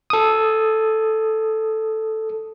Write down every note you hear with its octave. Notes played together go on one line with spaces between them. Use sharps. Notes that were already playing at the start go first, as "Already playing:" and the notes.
A4 D#6